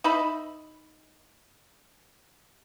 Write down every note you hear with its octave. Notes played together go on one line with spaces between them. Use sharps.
D#4 E5 B5